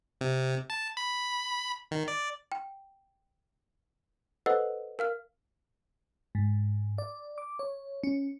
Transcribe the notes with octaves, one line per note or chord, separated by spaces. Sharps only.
C3
A5
B5
D#3
D5
G5
A4 B4 C5 D#5 F#5 E6
A#4 F5 F6
G#2
D5
D6
C#5
C#4